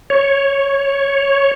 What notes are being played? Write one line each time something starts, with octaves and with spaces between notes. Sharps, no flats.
C#5